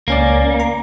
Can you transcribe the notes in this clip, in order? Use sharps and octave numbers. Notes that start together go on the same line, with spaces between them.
C#2 A#3 C#4 D5
A#5